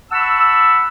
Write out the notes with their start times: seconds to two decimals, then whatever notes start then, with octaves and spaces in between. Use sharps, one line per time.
0.11 F#5 A5 B5 C#6 E6